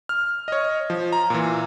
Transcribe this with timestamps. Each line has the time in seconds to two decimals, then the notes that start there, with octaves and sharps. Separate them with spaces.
0.09 F6
0.48 C#5 D#5
0.90 F3
1.13 A#5
1.30 A#2 E3